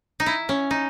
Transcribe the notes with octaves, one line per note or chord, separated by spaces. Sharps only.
D#4
E4
C#4
D#4